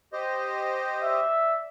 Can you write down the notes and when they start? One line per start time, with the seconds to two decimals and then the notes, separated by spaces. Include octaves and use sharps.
0.13 G4 C5 D#5
1.03 D5 E5